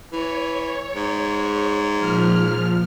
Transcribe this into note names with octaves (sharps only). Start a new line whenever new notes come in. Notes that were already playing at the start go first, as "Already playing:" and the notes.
E3 C#5
G#2
A#2 F3 F6